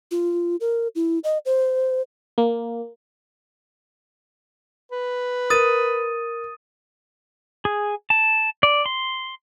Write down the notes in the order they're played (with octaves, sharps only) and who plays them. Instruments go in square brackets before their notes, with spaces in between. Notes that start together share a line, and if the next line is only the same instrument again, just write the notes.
[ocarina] F4
A#4
E4
D#5
C5
[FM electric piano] A#3
[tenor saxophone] B4
[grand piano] A#4 [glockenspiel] D#6 A6 D#7
[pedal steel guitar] G#4
A5
D5
C6